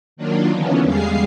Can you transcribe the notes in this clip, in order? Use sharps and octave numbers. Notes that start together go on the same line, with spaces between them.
D#3 F#3 A#3 D4 F4
D3 E3 B3 C#4
E2 G3 G#3 G#4 F5 C7